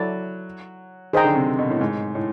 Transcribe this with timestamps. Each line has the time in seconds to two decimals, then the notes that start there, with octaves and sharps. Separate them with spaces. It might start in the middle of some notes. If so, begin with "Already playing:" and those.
Already playing: F#3 E4 A4 D5
1.13 D#3 G#4 C5 D#5 G5 A#5
1.24 D3
1.36 C3
1.59 B2
1.70 A2
1.81 G#2
2.15 A2